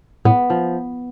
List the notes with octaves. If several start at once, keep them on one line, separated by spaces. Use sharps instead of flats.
A2 B3
F3